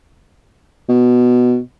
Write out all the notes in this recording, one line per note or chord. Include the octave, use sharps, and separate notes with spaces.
B2